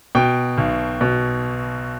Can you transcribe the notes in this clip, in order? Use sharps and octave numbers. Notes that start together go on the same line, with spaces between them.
B2 G5
B1
B2